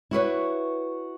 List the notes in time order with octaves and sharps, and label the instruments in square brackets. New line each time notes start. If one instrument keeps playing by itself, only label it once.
[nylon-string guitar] E4 F#4 B4 C#5